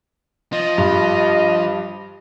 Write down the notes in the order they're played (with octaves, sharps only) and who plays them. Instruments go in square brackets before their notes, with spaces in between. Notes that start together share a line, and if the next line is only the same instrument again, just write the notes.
[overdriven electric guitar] F3 [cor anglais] D#5
[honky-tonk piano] G2